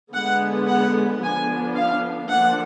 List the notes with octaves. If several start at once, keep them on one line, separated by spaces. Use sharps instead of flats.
D3 G#3 B3 F#5
F#5
D3 F3 B3 D4 G#5
F5
F3 A#3 D4 F#5